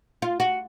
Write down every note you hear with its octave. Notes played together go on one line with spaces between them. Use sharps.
F4
F#4